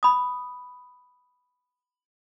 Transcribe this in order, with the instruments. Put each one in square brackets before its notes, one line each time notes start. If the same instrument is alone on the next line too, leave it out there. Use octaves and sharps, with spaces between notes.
[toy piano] B5 D#6